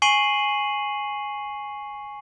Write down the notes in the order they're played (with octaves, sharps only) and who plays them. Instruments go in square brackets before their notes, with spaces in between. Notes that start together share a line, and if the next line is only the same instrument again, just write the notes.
[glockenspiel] G#5 C#6 C7 D#7 F#7